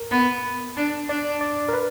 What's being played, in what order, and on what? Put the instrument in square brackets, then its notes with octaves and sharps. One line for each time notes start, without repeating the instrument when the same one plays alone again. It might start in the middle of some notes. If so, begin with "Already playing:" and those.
Already playing: [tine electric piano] A#4
[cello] B3
D4
[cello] D4 [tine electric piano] D5
[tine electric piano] D5
A#4
B4